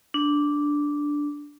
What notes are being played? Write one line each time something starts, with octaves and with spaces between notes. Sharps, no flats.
D4